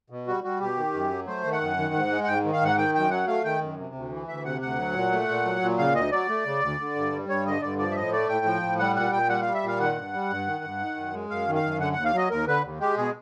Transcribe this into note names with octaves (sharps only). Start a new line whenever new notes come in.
B2
G3 F#4
G3 F#4
B2 G4
D#3
F#2
F#3
A3 C5
D#3
F#5
F#2
D#3
G#2
G#3
F#5
G#2 G5
D#3
F5
G#2 F#5
D#3 G5
F#2 G5
F#3 F#5
A3 F5
D#3 G5
F#2
C3
D2
E3
D2 E5
C3 F#5
D2 F#5
F#3
A#2
A3
A#2
F#3
A#2
C#3 F5
D2 D#5
F#3 D5
A3
C#3
D2
D3
G2
G3
G2 C#5
D3 D#5
G2 D5
F3 D5
E5
A2 D#5
A3 D5
A2 G5
F3
A2
G3 F#5
A#2 F#5
A#2 G5
G3 F#5
G3 F5
E5
A#2 F5
D#3 F#5
G2
G3
G2
D#3
G2
D#3
F#2
G#3
F#2 F5
D#3
F5
F#2
D3 F#5
D#2 F#5
F5
F#3 D#5
D#2 A#4
D3 B4
D#2
G#3 G4
B2 G#4